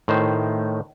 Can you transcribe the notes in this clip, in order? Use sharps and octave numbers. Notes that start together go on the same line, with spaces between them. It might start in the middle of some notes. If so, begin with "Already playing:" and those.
A2 D#3 C5